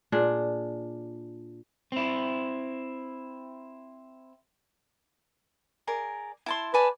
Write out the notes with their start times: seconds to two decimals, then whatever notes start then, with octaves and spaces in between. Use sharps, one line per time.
0.12 A#2 D4 G#4
1.92 C4 E4
5.87 G#4 A#4 D5
6.46 E4 A5 C6
6.74 B4 D5 G#5 A5